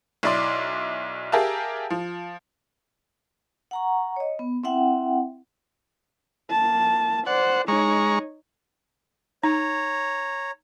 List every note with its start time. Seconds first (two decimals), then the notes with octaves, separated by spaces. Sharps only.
0.23 B1 E4 D5 C6 D6
1.32 G4 G#4 A#4 E5 F5 A5
1.90 F3
3.71 F#5 A#5 C#6
4.16 C#5 D#5
4.39 B3
4.64 C4 E4 E5 F#5 G5
6.50 A#3 A5
7.27 C5 D5 F#5
7.68 G#3 D#4 C#5 A#5 C#6
9.44 D#4 C#5 A#5